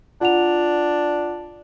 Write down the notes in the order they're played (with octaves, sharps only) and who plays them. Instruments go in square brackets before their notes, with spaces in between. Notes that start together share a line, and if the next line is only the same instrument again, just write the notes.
[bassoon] D4 [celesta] F4 F#5 F7